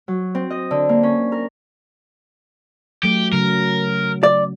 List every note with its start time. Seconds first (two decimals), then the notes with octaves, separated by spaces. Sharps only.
0.08 F#3
0.35 C4
0.50 D#5
0.71 D3
0.89 A#3
1.03 C#4
1.32 A#4
3.03 F#3 A3 G4
3.33 C#3 F#3 A#4
4.23 D5